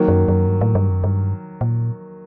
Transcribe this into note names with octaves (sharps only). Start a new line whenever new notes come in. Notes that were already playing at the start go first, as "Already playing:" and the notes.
Already playing: D#3 F#3 A#3
F#2
F#2
G2
A2
G2
F#2
G2
A#2